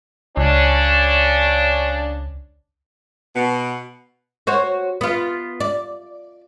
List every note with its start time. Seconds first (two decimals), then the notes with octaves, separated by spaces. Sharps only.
0.37 C#2 C#3 C#4 D4
3.36 B2
4.47 F#4 C5 C#5
5.01 B3 F4
5.60 D5